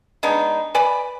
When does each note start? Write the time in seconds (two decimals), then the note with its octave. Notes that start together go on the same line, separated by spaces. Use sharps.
0.23 G#3 B3 D4 D#4
0.75 B4 D5 G#5 B5